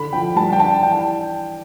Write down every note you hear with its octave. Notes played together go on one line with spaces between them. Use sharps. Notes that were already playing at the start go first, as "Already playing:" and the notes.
Already playing: D3 B5
F3 G5
G3 A5
G5
D4 A5
E3 G5